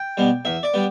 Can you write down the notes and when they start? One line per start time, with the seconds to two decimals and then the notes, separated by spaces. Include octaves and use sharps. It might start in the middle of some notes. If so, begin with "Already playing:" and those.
Already playing: G5
0.17 B2 G3 B3
0.45 E2 E5
0.63 D5
0.74 G3 B3